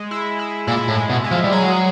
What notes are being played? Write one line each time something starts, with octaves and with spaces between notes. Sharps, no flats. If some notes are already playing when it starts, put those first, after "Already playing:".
Already playing: G#3
E4
E4
A#2 E4
A2
G#3
B2
G#3
F3
G3
F#3 G#4